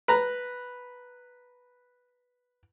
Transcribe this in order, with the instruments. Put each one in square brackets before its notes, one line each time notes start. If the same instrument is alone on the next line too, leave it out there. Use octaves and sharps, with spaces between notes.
[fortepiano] B4 A#5